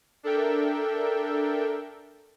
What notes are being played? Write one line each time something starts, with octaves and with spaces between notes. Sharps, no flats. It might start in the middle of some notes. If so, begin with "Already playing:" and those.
D4 A4 A#4 E5 G5